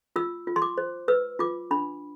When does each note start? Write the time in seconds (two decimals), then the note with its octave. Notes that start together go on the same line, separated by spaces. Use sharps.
0.16 F4 E6
0.47 F4
0.56 C6
0.62 D6
0.78 C5
1.08 B4 E6
1.39 F4 D6
1.71 D4 B5